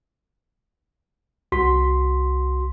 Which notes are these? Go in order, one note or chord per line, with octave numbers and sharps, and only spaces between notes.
C2 F#4 C6 B6